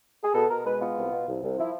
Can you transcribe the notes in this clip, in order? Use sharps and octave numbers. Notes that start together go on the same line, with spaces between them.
G#4
B2 A4
B2 A#4
G#3 B4
B3 F4
C2
B2
C2
C2
F3 E4